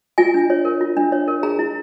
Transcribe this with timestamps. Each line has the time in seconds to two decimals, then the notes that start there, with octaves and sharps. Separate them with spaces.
0.18 F4 G#5
0.34 D4
0.50 C#5
0.65 A#4
0.81 F4
0.97 D4
1.12 C#5
1.28 A#4
1.43 G#4 A#5
1.59 E4